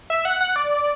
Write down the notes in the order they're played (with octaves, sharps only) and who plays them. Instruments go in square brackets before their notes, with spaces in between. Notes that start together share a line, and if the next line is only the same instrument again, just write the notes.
[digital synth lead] E5
F#5
F#5
D5